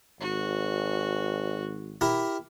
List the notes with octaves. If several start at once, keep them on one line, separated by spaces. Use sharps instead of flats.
G#1 F#4
E4 G4 A#4